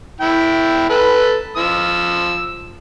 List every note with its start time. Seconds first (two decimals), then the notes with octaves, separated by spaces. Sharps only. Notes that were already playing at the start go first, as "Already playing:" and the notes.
0.20 E4 G5
0.89 A4 B4
1.56 F3 E6